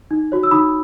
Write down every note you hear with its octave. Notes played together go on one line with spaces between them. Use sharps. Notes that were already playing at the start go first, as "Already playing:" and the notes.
D#4
F#4 C#5
E6
D#4 B5 D#6